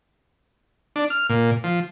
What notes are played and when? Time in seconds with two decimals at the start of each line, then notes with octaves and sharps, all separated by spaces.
0.96 D4
1.10 F6
1.30 A#2
1.64 F3